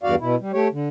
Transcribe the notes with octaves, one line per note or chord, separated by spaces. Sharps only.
E2 G2 F#4 D5 F5
B2 E4
G3
A3 G4 C#5
D3